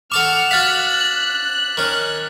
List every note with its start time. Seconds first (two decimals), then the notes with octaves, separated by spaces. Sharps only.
0.12 A4 F#5 A5 C#6 D6 F6
0.51 F#4 F5 F#6 A6 B6
0.90 F#7
1.77 D#3 C#4